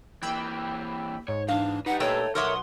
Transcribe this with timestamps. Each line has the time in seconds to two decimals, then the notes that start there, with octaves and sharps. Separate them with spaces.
0.23 E3 A#3 G5 B5 E6
1.28 G#2 C#5
1.48 E2 D4 F5
1.86 D#4 G4 B4 F#5
2.00 A#2 A3 C#5 G5
2.35 B1 A#4 C#5 E5 F#5 C6 D6 D#6